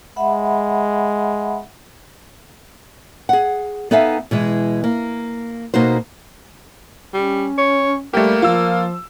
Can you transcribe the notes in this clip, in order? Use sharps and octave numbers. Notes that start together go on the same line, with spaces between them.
G#3 E5 F#5 B5
G#4 F#5
B3 D#4 A4 E5 F5 G#5
B2 E3 G#3
A#3
B2 A#3 D#4 F#4 C5
G3 C#4
C#5
G3 A3 A#3 G4
F3 F4 E6